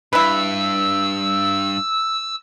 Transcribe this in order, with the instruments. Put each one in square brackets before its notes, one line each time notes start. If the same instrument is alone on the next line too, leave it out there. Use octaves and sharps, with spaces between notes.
[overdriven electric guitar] G2 [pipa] E4 B4 [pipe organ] E6